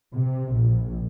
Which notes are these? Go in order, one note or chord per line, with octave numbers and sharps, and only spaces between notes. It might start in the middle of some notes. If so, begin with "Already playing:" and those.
C3
A#1